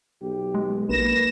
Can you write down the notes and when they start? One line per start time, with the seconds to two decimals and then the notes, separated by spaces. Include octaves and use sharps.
0.22 B1 G4
0.55 G#3
0.89 A#1 A#3 B4 A#6 E7